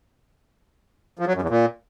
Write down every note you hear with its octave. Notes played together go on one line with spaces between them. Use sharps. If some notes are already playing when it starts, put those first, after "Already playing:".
F3
F#3
F#2
E2
A#2